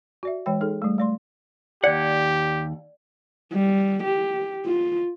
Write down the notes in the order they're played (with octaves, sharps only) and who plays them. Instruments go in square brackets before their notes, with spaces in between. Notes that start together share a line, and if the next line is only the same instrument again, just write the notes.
[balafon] F#4 D5 E5
E3 G#3 C#5 G5
D#4 G#4 A4
G3 A3
A3 D5 C6
[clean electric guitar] D#2 F#5 [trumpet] G4 [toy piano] D5
[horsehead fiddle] G3
G4
F4